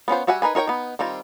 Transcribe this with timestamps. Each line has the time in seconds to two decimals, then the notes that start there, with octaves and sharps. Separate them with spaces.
0.08 B3 C#4 F4 C5
0.27 G3 F#4 E5 F#5 G#5
0.42 D#4 A#4 B4 G#5
0.55 D#4 A#4 C#5 G5
0.67 B3 D#4
0.99 D#3 G3 C4 F4